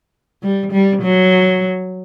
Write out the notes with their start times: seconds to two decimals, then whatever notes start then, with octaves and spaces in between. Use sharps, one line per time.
0.43 G3
0.72 G3
1.02 F#3